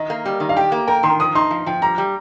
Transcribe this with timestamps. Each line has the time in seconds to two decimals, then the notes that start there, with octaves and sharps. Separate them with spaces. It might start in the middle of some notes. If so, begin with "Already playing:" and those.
Already playing: D#3 D#5
0.10 A#3
0.25 G3
0.40 D#3
0.49 F5
0.57 G4 G5
0.72 A#3
0.87 A#4 G5
1.03 D#3 C6
1.20 F3 D#6
1.35 D#4 C6
1.51 F3
1.66 F3 G5
1.82 G3 A#5
1.98 G3